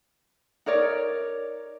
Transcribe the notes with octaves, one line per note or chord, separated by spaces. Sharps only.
D#4 A#4 C#5 D5